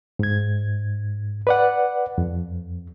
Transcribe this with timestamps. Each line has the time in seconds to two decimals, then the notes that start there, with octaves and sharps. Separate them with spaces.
0.19 G#2 G#6
1.47 B4 D5 F#5
2.18 F2